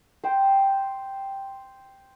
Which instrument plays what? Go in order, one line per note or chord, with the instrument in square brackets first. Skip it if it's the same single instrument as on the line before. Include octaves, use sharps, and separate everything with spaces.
[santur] C5 G5